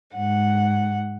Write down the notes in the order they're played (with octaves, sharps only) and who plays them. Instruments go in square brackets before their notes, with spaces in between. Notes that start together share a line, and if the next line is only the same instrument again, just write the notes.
[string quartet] G#2 F#5